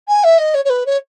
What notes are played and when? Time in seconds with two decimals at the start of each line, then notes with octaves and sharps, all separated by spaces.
0.08 G#5
0.24 E5
0.38 D#5
0.54 C#5
0.65 C#5
0.70 B4
0.86 C#5